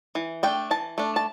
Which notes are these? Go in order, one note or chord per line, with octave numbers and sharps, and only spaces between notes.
E3
A3 D4 G5
E3 A5
A3 D4
A5